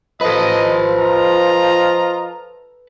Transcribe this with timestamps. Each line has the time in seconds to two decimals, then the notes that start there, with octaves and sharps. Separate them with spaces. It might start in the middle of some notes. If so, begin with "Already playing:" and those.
0.21 F3 A4 B4 D#5
0.97 F4 D#5 A#5